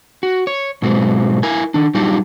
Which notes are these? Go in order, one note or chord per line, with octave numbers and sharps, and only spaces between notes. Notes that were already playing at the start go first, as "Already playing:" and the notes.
F#4
C#5
G#2 B2 F#3 G#3 C4
E4 A#4 G#5
D#3 D4
F#3 G3 D4 D#4 F4 G4